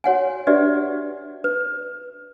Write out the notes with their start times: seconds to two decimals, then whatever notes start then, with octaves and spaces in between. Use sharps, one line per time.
0.04 F#4 C#5 F#5 G#5
0.47 D4 F#4 G4 B4 D5 E5
1.44 B4